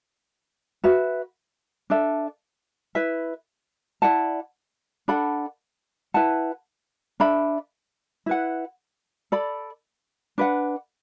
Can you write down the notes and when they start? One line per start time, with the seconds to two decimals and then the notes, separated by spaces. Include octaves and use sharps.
0.84 F#4 B4 E5
1.90 D4 A4 E5
2.95 E4 B4 E5
4.02 E4 D5 F#5 A5
5.08 D4 A4 F#5 B5
6.14 E4 B4 F#5 A5
7.20 D4 A4 E5 B5
8.26 E4 B4 F#5
9.32 A4 D5 B5
10.38 D4 B4 F#5